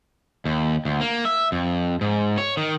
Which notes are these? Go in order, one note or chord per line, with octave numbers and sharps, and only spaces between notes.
D#2
D2
A#3
E5
F2
G#2
C#5
D#3